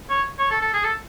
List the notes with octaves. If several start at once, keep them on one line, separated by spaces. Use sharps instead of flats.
C#5
C#5
A4
A4
G#4
A4